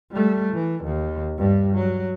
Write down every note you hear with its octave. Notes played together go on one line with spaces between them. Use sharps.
G3 A3
E3
D#2
G2 G3
F#3